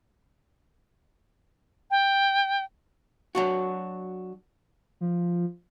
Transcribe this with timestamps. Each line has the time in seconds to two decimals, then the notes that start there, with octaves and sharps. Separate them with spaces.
1.91 G5
3.35 F#3 D4 F#4
5.01 F3